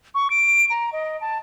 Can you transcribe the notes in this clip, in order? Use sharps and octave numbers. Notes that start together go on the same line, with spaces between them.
C#6
D7
A#5
D#5
A5